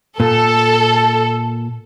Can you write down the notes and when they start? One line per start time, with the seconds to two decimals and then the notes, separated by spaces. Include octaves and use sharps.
0.20 A#2 A4